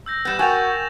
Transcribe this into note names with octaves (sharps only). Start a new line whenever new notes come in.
E6 G6 A#6
G3 B3 G6 E7
F#4 A#4 G5 G#5 C#6 A6 F7